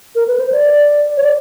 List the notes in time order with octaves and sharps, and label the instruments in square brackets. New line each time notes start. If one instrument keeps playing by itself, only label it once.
[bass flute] A#4
B4
C5
D5
C#5
D5